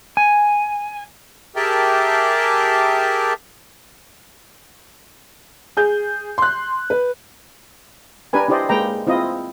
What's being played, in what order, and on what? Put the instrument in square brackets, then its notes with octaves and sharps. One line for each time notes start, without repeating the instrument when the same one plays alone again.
[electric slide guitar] G#5
[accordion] G4 G#4 A#4 E5 G5 A5
[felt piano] G#4 G6
C6 F#6
B4
[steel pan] D4 G4 A#4 B4 G#5
D4 E4 G4 C5 D5 D#5
G#3 A#3 B4 D5 G5 A#5
C4 E4 F4 D#5